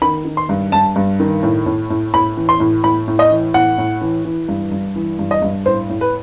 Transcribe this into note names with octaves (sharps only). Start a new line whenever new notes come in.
D#3 B5
D#3
C6
G2
G2 A5
G2
D#3
A2
A2
A2
A2 B5
E3
C6
A2
A2 B5
A2
D#5
E3
A2 F#5
A2
E3
E3
G2
G2
E3
G2
D#5
G2
A2 C5
A2
B4